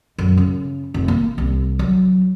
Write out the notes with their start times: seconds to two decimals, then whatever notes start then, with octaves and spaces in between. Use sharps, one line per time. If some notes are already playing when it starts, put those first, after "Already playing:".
0.18 F#2
0.37 C#3
0.94 F1
1.08 A#3
1.38 C2
1.79 F#3